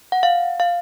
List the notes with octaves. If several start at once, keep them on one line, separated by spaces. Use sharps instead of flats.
F#5
F5
F5